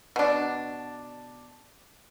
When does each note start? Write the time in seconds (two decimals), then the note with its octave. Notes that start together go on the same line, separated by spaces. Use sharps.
0.16 B2 D4